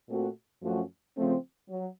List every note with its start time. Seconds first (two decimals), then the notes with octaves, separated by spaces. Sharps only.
0.09 A#2 A3 C4 F#4
0.62 F#2 F3 A3 C#4 F#4
1.17 C#3 F3 A3 C4
1.69 F#3